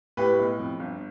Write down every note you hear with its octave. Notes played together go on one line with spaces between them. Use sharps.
A2 G4 B4
B1
F2
G1